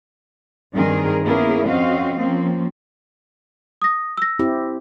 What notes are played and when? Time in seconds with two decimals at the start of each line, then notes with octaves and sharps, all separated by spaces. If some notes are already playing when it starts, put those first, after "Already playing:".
0.73 G2 D#3 C4 G#4 A#4
1.24 A#3 B3 C#4 E4 G#4 A#4
1.68 F2 C4 C#4 F#4 D#5 F5
2.17 F3 A#3 C4 C#4
3.82 D#6 A#6
4.17 E6 A#6
4.39 C4 E4 G4